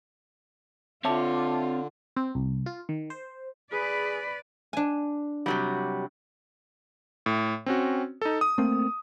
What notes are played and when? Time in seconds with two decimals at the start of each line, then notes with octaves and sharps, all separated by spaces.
1.04 D3 C4 F4 C#5 E5 A5 D6
2.16 C4
2.35 C2
2.66 F4
2.89 D#3
3.10 C5
3.72 G#4 B4 D5 B5
4.73 D4 G#5
5.46 C3 F#3 G3
7.26 A2
7.66 C4 C#4 F#4
8.22 D#4 A4
8.41 D#6
8.58 A3 A#3 C4